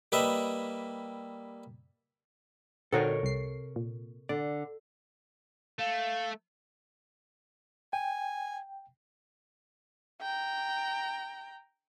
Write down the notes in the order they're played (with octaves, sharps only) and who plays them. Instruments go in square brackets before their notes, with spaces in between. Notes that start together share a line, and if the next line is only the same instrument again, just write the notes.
[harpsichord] G3 A#3 B4 D#5 E5
[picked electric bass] A#2 D3 [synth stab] C4 D#4 F#4 [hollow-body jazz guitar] A4 A#4 C#5
[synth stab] C2 C7 [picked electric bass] C3
[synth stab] A#2
[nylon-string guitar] D3 [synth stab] D5
[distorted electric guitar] A3 [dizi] F5
[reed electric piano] G5 [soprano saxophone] G#5
[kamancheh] G5 A#5